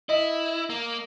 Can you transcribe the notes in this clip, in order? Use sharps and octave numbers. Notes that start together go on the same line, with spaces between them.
E4 D#5
A#3